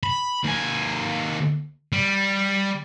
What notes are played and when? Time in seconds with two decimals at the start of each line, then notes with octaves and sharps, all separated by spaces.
0.03 B5
0.44 D#2 G#5
1.93 G3